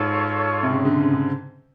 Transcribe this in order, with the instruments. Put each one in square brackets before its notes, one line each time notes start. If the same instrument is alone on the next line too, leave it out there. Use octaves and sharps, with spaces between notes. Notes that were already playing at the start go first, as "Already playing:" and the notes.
Already playing: [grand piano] G#2 [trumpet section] F4 A4 C#5
[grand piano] C3
C#3
D3
C#3
D3